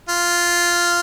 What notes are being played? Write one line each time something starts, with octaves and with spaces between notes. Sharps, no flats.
F4